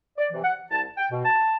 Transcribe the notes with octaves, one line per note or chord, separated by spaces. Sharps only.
D5
C3 E3
F#5
C2 A5
G5
B2
A5